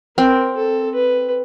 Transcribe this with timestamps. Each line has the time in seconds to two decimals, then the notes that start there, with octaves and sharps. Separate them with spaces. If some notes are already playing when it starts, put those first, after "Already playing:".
0.17 C4 A#4
0.57 A4
0.95 B4